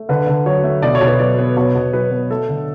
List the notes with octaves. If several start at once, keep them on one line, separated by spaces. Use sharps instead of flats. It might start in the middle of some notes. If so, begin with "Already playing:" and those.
Already playing: A3
D3 B4
D3
F#3 C#5
A3
B2 D5
C#5
B2
B4
F#3 D5
B3
B2 C#5
B2
F#3 B4
B3
A3 A4
D3